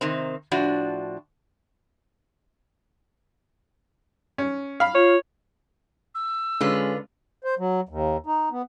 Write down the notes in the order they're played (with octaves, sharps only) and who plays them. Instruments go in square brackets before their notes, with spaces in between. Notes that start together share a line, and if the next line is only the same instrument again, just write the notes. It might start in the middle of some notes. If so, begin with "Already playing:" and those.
[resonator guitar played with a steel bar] C3 D#3 C4
A2 F3 D4 F#4
[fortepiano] C#4
F5 B5
[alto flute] F4 [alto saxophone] C#5
[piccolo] E6
[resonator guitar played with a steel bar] D3 F4 B4 [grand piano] G#3 C#4
[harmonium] C5
F#3
D#2
D#4
B3